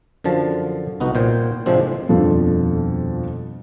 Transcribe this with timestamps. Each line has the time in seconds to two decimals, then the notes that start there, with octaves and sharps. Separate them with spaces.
0.24 F#2 D3 F3 A5
1.00 C2 B3 D#4 F#4
1.15 A#2 C5 G5
1.66 A2 C3 F3 G#3 C4 D4
2.09 D#1 F2 B2 F3 D4 A4